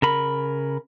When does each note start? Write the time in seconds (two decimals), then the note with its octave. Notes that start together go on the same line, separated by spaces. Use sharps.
0.02 C#3 A#4 B5